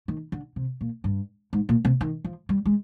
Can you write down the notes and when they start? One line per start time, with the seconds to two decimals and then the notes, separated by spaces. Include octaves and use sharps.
0.08 D#3
0.32 D3
0.56 C3
0.81 A#2
1.04 G2
1.53 G#2
1.69 A#2
1.85 C3
2.01 D#3
2.24 F3
2.49 G3
2.66 G#3